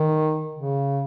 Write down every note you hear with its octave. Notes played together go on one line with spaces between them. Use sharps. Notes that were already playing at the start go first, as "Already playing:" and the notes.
Already playing: D#3
C#3